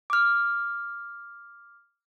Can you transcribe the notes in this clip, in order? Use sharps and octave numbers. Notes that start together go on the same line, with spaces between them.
D6 F6